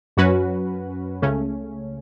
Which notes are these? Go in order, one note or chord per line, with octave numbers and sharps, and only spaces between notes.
F#2 F#3 C#4 F#4 B4
C#2 C#3 A3 C#4